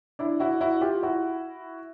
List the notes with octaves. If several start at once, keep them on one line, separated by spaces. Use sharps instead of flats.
D4 E4
E4 F#4
E4 F#4
F4 G4
E4 F#4